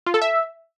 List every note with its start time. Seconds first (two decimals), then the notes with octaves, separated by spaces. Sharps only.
0.06 F4
0.14 A4
0.22 E5